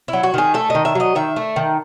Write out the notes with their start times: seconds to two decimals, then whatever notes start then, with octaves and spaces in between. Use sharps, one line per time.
0.08 E4
0.13 F#3
0.23 F#4
0.34 D#3 G#4
0.54 A3 A4
0.70 D#3 D#5
0.85 E5
0.95 F#3 D#5
1.15 D#3 E5
1.36 A3
1.56 D#3